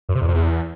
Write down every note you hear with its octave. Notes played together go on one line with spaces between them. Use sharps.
F#2
C3
E2
F2
E2